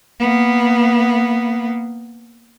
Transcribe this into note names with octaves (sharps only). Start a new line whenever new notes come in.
A#3 B3